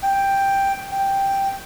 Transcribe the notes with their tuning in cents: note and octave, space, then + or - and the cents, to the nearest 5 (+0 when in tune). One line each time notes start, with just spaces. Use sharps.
G5 +5
G5 +0